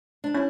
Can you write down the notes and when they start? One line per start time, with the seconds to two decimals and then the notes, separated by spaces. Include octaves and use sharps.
0.24 D4
0.34 C#4 E4